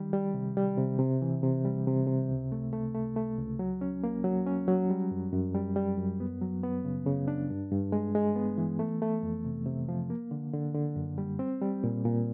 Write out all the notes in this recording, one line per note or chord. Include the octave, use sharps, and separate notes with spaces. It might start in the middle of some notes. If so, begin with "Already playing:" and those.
Already playing: D#3 G3
G3
C3
G3
C3
C3
E3
C3
G3
C3
C3
C#2
A3
A3
A3
A3
C#2
F#3
C#4
A#3
F#3
C#4
F#3
G3
F#2
F#2
G3
G3
F#2
B3
F#3
B3
C#3
C#3
D4
G2
G2
G#3
G#3
B3
E3
A3
A3
F2
C3
C3
F3
A#3
D3
D3
D3
F#2
G3
C4
G3
A#2
A#2